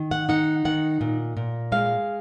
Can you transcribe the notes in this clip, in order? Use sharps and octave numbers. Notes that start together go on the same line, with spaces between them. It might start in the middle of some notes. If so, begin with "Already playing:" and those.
Already playing: D#3
F#5
D#4 F#5
D#3 F#5
A#2
A#2
G#3 F5